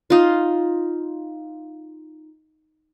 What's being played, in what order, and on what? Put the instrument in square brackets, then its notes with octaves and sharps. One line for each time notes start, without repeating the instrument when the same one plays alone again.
[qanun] D#4 F4